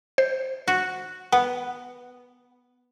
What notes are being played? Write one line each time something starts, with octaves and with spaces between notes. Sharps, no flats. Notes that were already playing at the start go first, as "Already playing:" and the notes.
C5
F#4
B3 F#5